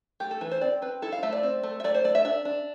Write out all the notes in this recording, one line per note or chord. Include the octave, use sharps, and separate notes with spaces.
A3 G4
A4
E3 B4
C5
C4 D5
C4 B4
E4 A4
F5
A3 E5
D5
C4
A3
E5
A3 D5
C5
A3 D5
E5
D4 E5
D4